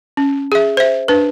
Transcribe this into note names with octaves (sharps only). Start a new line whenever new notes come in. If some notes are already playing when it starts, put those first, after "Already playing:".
C#4
G#4 E5
C5 E5
D4 B4